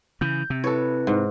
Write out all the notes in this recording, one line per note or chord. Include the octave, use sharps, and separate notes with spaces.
C#3 E3 G6
C3
E4 A4 B4 C#5
G#2